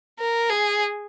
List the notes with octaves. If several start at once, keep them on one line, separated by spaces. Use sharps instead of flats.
A#4
G#4